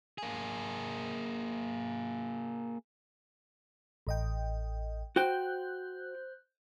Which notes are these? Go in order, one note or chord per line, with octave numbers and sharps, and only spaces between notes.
A#3 G#4
A1 D#5 G5
F#4 C5 G5 F#6 G6